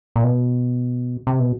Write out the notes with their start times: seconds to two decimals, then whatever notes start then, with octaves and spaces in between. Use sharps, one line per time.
0.16 A#2
0.24 B2
1.27 C3
1.40 B2